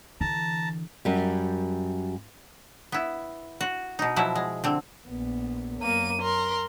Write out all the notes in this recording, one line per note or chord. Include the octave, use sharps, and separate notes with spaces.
D3 E3 A5 A#5
F#2 G3
B3 E4
F#4
B2 D#4
B2 F3 F#3 E4
G#3
D3 C4
A#1 B3
F#2 A#3 D#7
A#4 C6